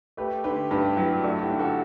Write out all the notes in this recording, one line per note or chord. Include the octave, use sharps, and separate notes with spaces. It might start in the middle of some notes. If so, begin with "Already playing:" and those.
A3 G4 B4
D3 G4 B4
G2 G4 B4
F#3 E4 G4
A3 D4 F#4
E4 G4
D3
F#4 A4